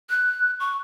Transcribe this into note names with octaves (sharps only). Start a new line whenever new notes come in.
F#6
C#6